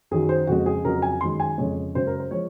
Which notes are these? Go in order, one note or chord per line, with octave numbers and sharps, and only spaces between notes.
F#2 D#3 F#3 G#4
C5
F2 C#3 F3 G#3 F#4
G#4
F2 C#3 F#3 A#4
G#5
F#2 D#3 G#3 C6
G#5
F2 C#3 G#3 C#5
F#2 C#3 G#3 C5
A#4
C5
F3 G#3 C#5